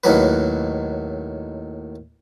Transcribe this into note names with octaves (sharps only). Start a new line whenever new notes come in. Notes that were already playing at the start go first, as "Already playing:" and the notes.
D#2 A2 F#3 B4